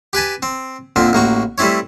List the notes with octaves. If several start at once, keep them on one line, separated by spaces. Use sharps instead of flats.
G4 B4 G#5 A5
C4
F2 A#2 D3 C4
A1 A#3 F#4 C#6
G3 A3 C4 E4 C#5